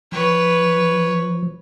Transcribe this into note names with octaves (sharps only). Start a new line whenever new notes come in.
F3 B4 C#5